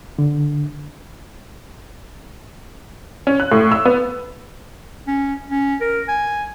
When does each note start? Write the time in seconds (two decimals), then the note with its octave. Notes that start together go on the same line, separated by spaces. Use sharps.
0.19 D3
3.27 C#4
3.40 F#6
3.52 A2
3.72 E6
3.85 B3
5.07 C#4
5.50 C#4
5.81 A#4
6.08 G#5